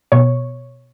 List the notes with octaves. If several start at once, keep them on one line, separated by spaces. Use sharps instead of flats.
B2 C#5